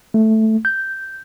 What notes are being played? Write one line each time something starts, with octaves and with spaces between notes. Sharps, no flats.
A3
G6